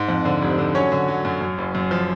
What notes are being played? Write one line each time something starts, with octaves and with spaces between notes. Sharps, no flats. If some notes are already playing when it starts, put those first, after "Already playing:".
Already playing: G#2
F2
D3
F1
D3
F#3 C#4 C#5
D3
F#3
F#2
F#2
F#1
F#2
F3